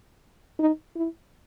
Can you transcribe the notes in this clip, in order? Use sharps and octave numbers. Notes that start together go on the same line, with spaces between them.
D#4
E4